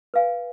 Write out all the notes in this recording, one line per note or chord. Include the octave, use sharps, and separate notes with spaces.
B4 F5 G#5